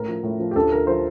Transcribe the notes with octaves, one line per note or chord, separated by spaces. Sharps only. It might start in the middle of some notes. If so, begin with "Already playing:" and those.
Already playing: A2 A#4
F3
A2
F3
G4
D2 A4
D3 A#4
F3 C5